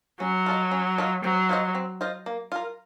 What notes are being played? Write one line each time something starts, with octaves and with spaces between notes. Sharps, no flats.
F#3 C#4
F4 A4 D#5
C#4
F4 A4 D#5
F#3 C4
F4 C5 D#5
C4
F4 C5 D#5
A#3
F4 A#4